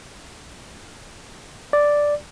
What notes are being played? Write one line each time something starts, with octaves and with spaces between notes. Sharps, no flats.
D5